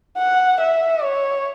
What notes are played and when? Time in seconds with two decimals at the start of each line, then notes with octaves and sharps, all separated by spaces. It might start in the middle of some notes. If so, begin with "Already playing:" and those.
0.18 F#5
0.60 E5
1.03 C#5